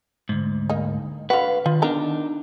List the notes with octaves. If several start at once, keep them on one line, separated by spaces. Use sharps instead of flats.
D2 G#2
A#3 D#4
D3 F#4 B4 F5
D#3 F4
B3 D4 D#4 A#4 A#5